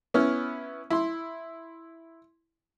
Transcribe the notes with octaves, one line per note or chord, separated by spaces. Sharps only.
B3 C#4 E4 F6
E4 C6